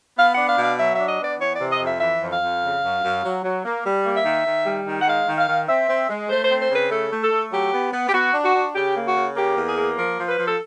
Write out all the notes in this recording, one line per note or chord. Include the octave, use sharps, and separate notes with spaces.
B3 F5
F#5
D4
F5
B2
F5
F#3 E5
D4 E5
D#5
B3 D5
E3 C#5
C3 D5
D#5
F2
E5
E3 E5
F2
F5
F2
C#3
F#2
F#2
F#3
F#3
A#3
G3
A#3
E5
D#3
D#3
G3
D#3
F#5
G#3 F5
D#3
F5
D#3
C4 E5
C4
G#3
A3 C5
C5
C4
C5
C#3
B4
A3 A4
A3
A4
A3
F#3 G4
B3
B3
G4
B3 F#4
D4
F#4
D4
C#3 G4
A#3
F#4
C#3
A#3 G4
E2
G#4
A#3
F3 A#4
F3
B4
F3
A4